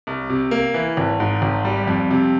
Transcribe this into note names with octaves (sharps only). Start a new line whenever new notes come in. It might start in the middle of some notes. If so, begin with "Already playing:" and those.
C2
C3
A#3
E3
G#1
G#2
G#1
G3
F2
C3